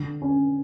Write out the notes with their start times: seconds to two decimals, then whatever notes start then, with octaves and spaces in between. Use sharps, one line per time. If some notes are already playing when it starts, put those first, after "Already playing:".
Already playing: D3
0.22 C#4